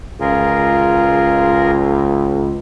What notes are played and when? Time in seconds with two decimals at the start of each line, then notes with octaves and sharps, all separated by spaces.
0.20 C#2 F4 G#4 A#4